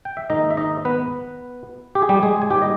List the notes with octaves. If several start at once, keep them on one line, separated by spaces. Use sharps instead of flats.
G5
E5
G#2 D#3 A#3 D#4 D#5
E5
D#4 D#5
B3 B4
G4
G#4
G3 G4
G#3 G#4
G#5
G#2 G3 A#3 G4 G5
D#5